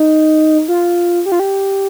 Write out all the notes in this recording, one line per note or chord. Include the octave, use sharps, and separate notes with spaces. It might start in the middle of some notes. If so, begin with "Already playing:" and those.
Already playing: D#4
F4
G4
F4
G4